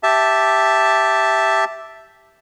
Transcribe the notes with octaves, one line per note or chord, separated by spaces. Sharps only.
G4 E5 A5